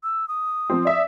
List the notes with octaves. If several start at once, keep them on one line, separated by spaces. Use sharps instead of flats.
E6
D#6
F3 C4
D5 E5